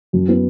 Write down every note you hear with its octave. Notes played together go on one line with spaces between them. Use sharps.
F#2
B3